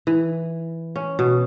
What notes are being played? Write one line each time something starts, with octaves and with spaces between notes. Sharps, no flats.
E3
C#4
B2